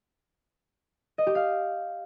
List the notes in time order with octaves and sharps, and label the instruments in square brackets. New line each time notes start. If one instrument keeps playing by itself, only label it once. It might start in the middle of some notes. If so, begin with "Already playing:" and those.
[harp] D#5
G4
F5